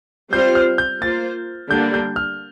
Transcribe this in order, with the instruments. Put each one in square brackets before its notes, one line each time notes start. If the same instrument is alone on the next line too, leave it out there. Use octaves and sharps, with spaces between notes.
[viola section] G3 C4 F4 C5 [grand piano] G6
[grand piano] F6
G6
[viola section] A#3 F4 C5 [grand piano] A6
[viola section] D3 G3 A#3 D4 [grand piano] G6
[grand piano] G6
F6